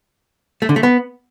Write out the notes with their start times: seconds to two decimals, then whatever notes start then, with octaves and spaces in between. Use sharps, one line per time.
0.62 A3
0.69 D3
0.76 A3
0.83 B3